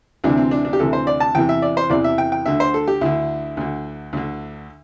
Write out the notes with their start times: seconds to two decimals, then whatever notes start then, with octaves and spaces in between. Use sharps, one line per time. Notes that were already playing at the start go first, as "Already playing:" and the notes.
0.24 D2 C3 E3 D4
0.37 C4
0.51 D4
0.65 D4
0.73 G4
0.79 D2 C3 E3 A4
0.93 C5
1.07 D5
1.20 A5
1.35 E2 C3 E3 G5
1.49 E5
1.62 D5
1.77 C5
1.90 E2 C3 E3 D5
2.04 E5
2.18 G5
2.32 G5
2.46 D2 D3 E5
2.60 C5
2.74 A4
2.88 G4
3.01 D2 D3 E4
3.57 D2 D3
4.13 D2 D3